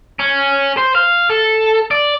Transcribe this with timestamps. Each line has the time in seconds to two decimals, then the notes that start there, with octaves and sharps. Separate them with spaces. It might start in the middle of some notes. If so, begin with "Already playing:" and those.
0.20 C#4
0.77 C5
0.95 F5
1.30 A4
1.91 D5